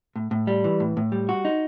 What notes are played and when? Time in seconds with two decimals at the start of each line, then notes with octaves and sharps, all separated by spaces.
0.16 A2
0.31 A2
0.47 G3
0.64 E3
0.80 A2
0.97 A2
1.12 G3
1.29 F#4
1.45 D#4